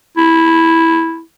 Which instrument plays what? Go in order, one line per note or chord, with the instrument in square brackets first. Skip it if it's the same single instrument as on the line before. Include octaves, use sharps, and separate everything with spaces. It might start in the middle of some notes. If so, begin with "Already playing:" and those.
[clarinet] E4